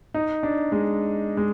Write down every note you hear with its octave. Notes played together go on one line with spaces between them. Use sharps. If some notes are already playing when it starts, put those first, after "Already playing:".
D#4
D4
G#3
G#3